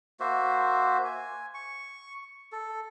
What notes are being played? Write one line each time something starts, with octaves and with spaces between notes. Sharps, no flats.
A#3 F#4 C5 E5
G#5
C#6
A4